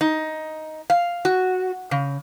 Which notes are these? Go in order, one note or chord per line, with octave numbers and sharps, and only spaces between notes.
D#4
F5
F#4
C#3